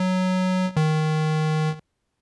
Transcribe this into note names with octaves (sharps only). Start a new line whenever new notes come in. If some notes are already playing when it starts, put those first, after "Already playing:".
Already playing: F#3
D#3